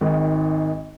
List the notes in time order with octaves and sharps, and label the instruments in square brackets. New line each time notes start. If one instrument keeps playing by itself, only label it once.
[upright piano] G#1 G#2 D#3